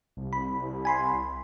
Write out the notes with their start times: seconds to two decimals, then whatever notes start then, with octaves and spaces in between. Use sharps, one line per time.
0.17 C2
0.33 B5
0.85 G#5 B5 C6